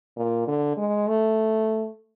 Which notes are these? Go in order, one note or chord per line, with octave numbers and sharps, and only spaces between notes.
A#2
D3
G#3
A3